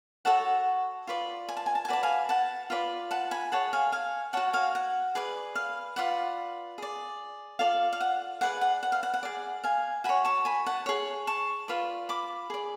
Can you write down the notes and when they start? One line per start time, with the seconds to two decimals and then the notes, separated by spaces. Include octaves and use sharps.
0.25 F#4 A4 C#5 F#5 A5
1.07 F4 B4 D5
1.49 G#5
1.57 A5
1.66 G#5
1.75 A5
1.85 G#5
1.88 F#4 B4 D5 A5
2.03 F5 G#5
2.29 F#5 A5
2.70 F4 B4 D5
3.11 F#5 A5
3.31 G#5 B5
3.52 G#4 C#5 F#5 A5
3.73 F5 G#5
3.92 F5 G#5
4.33 F#4 C#5 F#5 A5
4.53 F5 G#5
4.75 F#5
5.15 G#4 B4 D5
5.55 F5
5.96 F4 B4 D5 F#5
6.78 G#4 D5
7.59 F4 A4 D5 F5
7.93 F5
8.00 F#5
8.41 G#4 B4 D5 F#5
8.61 F#5
8.83 F#5
8.92 F5
9.03 F#5
9.14 F#5
9.23 G#4 D5
9.64 F5 G#5
10.04 F#4 C#5 G#5 B5
10.25 A5 C#6
10.45 G#5 B5
10.66 F#5 A5
10.86 G#4 C#5
11.27 A5 C#6
11.68 F4 B4 D5
12.09 B5 D6
12.50 G#4 D5